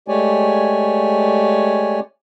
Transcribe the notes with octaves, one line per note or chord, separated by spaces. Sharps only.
G#3 A3 G4 C#5 D5 G#5